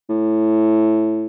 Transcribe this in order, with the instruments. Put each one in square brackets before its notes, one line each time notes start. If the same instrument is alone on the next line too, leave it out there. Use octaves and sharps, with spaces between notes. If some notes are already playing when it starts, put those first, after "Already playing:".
[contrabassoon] A2